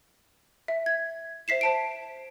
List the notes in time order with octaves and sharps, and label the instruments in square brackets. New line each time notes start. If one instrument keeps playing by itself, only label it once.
[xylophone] E5
G#6
C5 E5 B6 C7 E7
C5 A5 D7